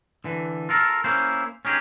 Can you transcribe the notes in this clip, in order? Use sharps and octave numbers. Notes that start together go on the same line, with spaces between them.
D3 E3
F4 A4 A#4
A#3 C#4 E4 C5
C#4 D#4 G4 G#4